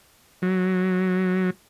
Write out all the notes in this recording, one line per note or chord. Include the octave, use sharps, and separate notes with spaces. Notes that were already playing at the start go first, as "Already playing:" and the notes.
F#3